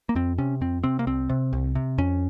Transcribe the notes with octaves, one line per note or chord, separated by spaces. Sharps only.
A#3
F2 C4
C3 C#4
F2 C4
C3 C4
A#3
C2 C4
C3
C2
C3
F2 C#4